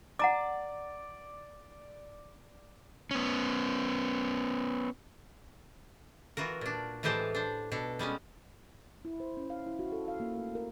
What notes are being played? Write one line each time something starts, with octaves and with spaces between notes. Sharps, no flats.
D5 F#5 A#5 D6
B3 C#4
E3 F4 F#4 A#4
A#2 D4
A2 E3 G#3 G4 C5 A5
D4 C5
B2 D4 A4
G3 G#3 B3 C#4
E4
C5
C#4
F5
E4
F#4
A4
F5
A#3
A3
A#4